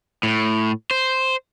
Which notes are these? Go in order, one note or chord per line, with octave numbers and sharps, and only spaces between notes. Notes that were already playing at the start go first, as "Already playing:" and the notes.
A2
C5